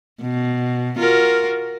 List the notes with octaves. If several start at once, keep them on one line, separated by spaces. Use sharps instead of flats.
B2
F4 F#4 A#4